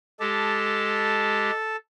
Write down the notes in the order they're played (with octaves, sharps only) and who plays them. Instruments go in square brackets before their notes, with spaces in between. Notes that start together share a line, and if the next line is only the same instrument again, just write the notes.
[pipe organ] G#3 G4 [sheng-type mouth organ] A4 A5